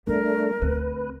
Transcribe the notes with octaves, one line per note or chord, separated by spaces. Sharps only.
G3 A3 B3 D4 A#4
D2 C4 B4